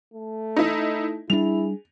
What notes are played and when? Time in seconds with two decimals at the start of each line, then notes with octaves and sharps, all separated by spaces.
0.14 A3
0.56 D#4 E4
1.30 G3 D4 E4 G#4 F7